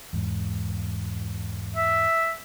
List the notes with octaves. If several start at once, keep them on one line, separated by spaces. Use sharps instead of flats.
E2 G#2
E5